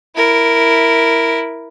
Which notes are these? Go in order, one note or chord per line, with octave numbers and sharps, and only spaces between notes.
E4 A#4